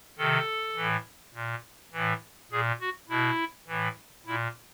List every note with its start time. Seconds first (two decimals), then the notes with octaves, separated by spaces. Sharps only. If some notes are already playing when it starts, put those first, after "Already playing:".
0.18 C3 D#3 A4
0.76 A2 E3
1.34 A#2
1.93 A2 E3
2.51 A#2 G#4
2.81 F#4
3.09 B2 E4
3.68 A2 E3
4.26 A#2 E4